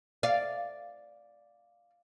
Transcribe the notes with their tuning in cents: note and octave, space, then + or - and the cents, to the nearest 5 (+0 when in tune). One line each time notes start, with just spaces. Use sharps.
D5 +0 F5 +0